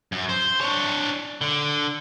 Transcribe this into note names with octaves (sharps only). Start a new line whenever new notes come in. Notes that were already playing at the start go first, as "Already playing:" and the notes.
F#2
C5
D4 C#5
D3